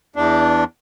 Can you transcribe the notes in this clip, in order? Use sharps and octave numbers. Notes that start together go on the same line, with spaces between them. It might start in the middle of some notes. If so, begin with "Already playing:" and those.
E2 D4